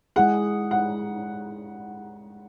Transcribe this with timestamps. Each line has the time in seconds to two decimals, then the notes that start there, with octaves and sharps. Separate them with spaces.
0.16 G#3 E4 G#4 F#5
0.71 F#5